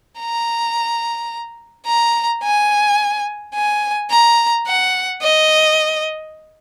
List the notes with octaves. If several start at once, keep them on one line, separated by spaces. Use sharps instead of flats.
A#5
A#5
G#5
G#5
A#5
F#5
D#5